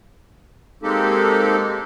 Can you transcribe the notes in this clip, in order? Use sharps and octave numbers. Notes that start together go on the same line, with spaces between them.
G#3 A#3 C4 D#4 G4 A4